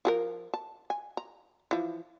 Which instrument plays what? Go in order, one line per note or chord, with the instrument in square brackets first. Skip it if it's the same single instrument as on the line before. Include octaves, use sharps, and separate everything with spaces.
[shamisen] F3 G#4 A#4
A5
G#5
A#5
E3 F3